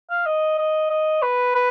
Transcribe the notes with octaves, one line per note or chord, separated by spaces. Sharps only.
F5
D#5
D#5
D#5
B4
B4